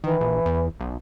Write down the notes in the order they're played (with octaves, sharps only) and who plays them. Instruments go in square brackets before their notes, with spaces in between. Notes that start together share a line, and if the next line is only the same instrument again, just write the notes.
[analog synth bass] D#3 [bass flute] E3
[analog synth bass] A#1
E2
B1